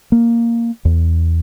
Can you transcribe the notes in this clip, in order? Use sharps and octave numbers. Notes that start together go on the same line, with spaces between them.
A#3
E2